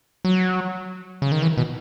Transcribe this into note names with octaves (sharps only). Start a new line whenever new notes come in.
F#3
C#3
D#3
E3
B2